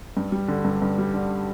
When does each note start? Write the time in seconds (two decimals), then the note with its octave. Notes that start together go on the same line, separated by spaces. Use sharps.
0.17 G2
0.32 G3
0.48 D3
0.65 G2
0.82 G2
0.98 G3
1.14 D3